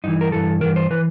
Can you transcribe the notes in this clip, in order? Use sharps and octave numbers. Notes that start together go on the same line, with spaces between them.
G2 E3 D#4
A#4
G2 E3 A4
G2 E3 A#4
C5
E3 B4